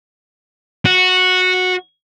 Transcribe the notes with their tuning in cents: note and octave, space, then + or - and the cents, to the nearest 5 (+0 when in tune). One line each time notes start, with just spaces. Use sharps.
F#4 -10